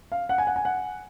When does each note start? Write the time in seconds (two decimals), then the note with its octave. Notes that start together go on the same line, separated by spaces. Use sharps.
0.12 F5
0.29 F#5
0.38 G#5
0.47 F#5
0.56 G#5
0.65 F#5